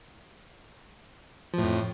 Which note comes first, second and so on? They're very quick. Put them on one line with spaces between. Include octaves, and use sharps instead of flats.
F3 A2 F2